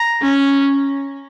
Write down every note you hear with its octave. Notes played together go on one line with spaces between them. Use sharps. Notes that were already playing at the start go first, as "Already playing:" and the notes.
Already playing: A#5
C#4